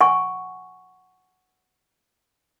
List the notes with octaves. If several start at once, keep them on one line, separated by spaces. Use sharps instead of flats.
F#5 G#5 C#6